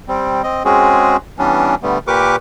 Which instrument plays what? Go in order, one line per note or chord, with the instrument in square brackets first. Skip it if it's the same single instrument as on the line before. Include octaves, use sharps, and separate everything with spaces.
[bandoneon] G3 C4
C4 D#5
G#3 C4 C#4 F#4 G#4
E3 G3 B3 C#4 D4
D3 G3 A3 B3
A#2 G4 A#4 B4 C#6 D6